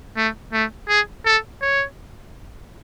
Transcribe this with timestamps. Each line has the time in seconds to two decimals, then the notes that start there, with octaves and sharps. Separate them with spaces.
0.17 A3
0.53 A3
0.89 G#4
1.26 A4
1.62 C#5